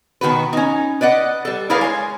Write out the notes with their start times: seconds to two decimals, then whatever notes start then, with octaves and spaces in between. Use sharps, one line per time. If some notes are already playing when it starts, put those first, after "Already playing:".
0.21 B2 D#3 F#4 B4
0.53 C#4 D#4
1.01 B4 D5 D#5 F#5
1.45 G3 A4
1.70 E4 G#4 A#4 B4 D5 F5
1.81 G#3 C#5